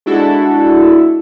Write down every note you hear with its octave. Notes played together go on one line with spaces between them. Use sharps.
G#3 D4 E4 F#4 A4